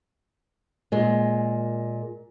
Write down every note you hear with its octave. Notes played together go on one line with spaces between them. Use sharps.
A#2 G#3